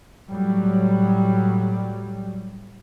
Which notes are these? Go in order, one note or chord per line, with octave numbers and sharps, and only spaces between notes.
A2 F#3 G3